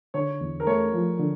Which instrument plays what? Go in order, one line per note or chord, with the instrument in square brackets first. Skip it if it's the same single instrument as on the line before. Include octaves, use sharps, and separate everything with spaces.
[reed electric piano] D3 [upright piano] C#5
[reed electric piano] E2
[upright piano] A#4
[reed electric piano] A3 [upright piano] C#5
[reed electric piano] F3
D3